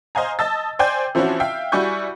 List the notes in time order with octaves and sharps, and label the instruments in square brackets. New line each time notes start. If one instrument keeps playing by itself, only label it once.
[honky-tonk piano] C5 D#5 F5 G#5 A#5
D#5 A5 E6 A6
C5 D5 G5 G#5 G6
E3 F3 C4 C#4 E4 F#4
E5 F5 G5
G3 E4 F#4 G#5 C#6 G6